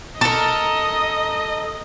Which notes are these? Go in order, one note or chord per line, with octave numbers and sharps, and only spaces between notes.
A4 A#4 D#5